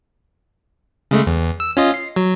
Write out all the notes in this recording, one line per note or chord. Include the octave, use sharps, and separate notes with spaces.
C#3 G#3 A3
E2
E6
C#4 F4 D#5
C7
F#3